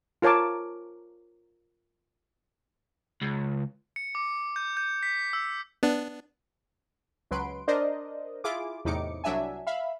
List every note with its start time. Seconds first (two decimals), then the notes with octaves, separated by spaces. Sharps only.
0.22 F4 A#4 C#5 A5 D6
3.21 C#2
3.96 C#7
4.15 D6
4.56 G6
4.77 G6
5.03 B6
5.33 E6
5.83 B3 D4
7.31 C#2 F#3 B4 C6 D7
7.68 D4 A#4 C5 D5 D#5
8.44 E4 F4 G#4 D6
8.85 E2 A2 C3 D#4 D6 C#7
9.24 C2 F#3 D4 E5 G#5
9.67 E5 F5 B5